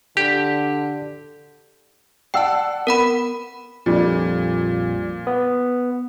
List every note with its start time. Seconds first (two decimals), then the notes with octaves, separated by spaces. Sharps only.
0.17 D3 G4
2.34 D5 F#5 G5 A5 E6
2.87 B3 A#4 F#5 B5
3.86 A#1 F2 A#2 G3
5.27 B3